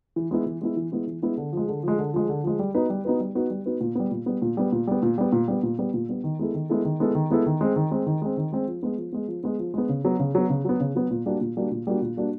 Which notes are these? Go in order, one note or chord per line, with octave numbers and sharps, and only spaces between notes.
E3
G#3 B3 E4
E3
G#3 B3 E4
E3
G#3 B3 E4
E3
G#3 B3 E4
D3
F3 G#3
D3
F3 G#3
D3
F3 G#3
D3
F3 G#3
G3
B3 D#4 F#4 B4
G3
B3 D#4 F#4 B4
G3
B3 D#4 F#4 B4
G3
B3 D#4 F#4 B4
A#2
G3 B3
A#2
G3 B3
A#2
G3 B3
A#2
G3 B3
A#2
G3 B3
A#2
G3 B3
A#2
G3 B3
A#2
G3 B3
D#3
G#3 B3 E4 A4
D#3
G#3 B3 E4 A4
D#3
G#3 B3 E4 A4
D#3
G#3 B3 E4 A4
D#3
G#3 C4
D#3
G#3 C4
D#3
G#3 C4
D#3
G#3 C4
F3
G#3 B3
F3
G#3 B3
F3
G#3 B3
F3
G#3 B3
C#3
F#3 B3
C#3
F#3 B3
C#3
F#3 B3
C#3
F#3 B3
A#2
G3 A#3 D4 F#4
A#2
G3 A#3 D4 F#4
A#2
G3 A#3 D4 F#4
A#2
G3 A#3 D4 F#4